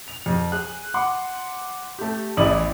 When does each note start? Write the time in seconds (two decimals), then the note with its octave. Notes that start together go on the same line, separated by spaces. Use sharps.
0.08 F7
0.26 F2
0.52 G#4 G#5 F#6
0.94 F#5 C6 D6
1.99 A3 G4
2.37 A1 E2 E4 D5 D#6 F#7